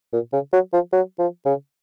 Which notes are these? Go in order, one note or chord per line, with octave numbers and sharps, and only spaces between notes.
A#2
C#3
F#3
F3
F#3
F3
C#3